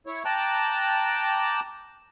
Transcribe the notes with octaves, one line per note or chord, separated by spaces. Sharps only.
E4 C#5
G5 A5 A#5 D6 F#6